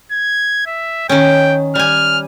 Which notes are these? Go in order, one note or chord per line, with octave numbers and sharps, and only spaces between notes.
G#6
E5
D#3 C#4 G5
G3 G#5 F6